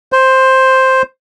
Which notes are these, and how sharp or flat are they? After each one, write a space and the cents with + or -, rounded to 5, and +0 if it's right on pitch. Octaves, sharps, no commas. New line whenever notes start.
C5 +5